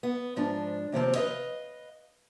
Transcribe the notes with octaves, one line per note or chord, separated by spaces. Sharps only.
B3
G#2 F3 D4
D#2 C3 F3 C4
B4 C5 D#5 F5